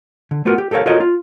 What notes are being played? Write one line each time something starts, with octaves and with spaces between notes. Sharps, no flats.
D3
A3 B3 F4 F#4 A#4
G4
G4 A4 A#4 C#5 F5
F4 F#4 A4 A#4 C#5 D#5
F4